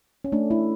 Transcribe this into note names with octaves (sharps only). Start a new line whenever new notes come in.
C#4
A3 D4
A3 E4